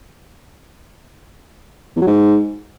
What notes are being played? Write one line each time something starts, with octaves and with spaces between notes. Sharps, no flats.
E2
F#3
G#2